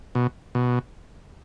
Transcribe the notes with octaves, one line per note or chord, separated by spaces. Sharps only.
B2
B2